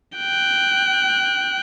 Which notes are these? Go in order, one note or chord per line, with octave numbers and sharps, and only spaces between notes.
G5 F#6